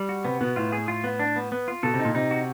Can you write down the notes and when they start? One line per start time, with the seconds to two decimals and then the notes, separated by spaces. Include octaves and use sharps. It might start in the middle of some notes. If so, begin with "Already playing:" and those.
Already playing: G3
0.09 F#4
0.25 C3 B3
0.41 B2 B3
0.56 A2 F4
0.73 G#4
0.88 F4
1.04 B3
1.19 D4
1.36 B3
1.52 B3
1.68 F4
1.83 B2 A4
1.94 C3
2.00 D#4
2.05 A#2
2.14 C3 D#4
2.31 F#4